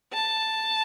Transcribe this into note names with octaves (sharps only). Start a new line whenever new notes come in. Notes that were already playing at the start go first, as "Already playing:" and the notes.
A5